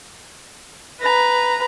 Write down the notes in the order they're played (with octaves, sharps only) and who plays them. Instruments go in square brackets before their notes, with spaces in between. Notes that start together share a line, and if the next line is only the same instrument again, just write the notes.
[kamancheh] B4 A#5